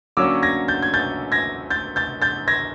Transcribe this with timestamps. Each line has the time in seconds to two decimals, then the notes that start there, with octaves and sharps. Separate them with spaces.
0.17 D3 F#3 A#3 C#4 D6 E6
0.43 G#6 A#6
0.68 G6 A6
0.83 G#6
0.94 G6 A6
1.32 G#6 A#6
1.70 G6 A6
1.96 G6 A6
2.22 G6 A6
2.48 G#6 A#6